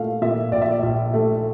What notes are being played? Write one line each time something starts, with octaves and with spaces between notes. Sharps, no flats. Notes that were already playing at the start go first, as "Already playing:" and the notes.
Already playing: A#2 A3 F5
A#2 E5
A#1 D5
E5
D5
A#1
A3